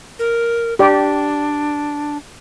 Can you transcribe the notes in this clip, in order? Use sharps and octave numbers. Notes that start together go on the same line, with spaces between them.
A#4
D4 G4 D5